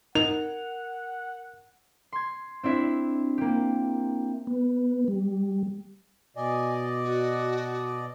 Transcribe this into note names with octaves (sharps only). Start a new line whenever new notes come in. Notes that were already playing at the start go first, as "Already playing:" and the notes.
D#4 A#4 F#5 F7
C6 G#6
C4 D4 E4 E5
A#3 G4
B3
G3
B2 D5 D#5 G#5
F#4